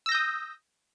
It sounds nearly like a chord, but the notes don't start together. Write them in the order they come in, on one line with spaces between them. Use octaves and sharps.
E6 A#6 G6 D#6